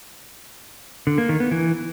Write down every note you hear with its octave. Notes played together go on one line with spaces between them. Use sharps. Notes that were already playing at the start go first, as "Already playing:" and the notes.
D3
A#3
D#3
B3
E3